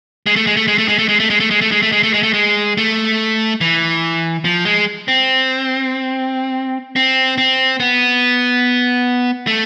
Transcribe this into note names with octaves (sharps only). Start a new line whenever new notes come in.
G#3
A3
G#3
A3
G#3
A3
G#3
A3
G#3
A3
G#3
A3
G#3
A3
G#3
A3
G#3
A3
G#3
A3
G#3
A3
E3
F3
G#3
C4
C4
C4
B3
A3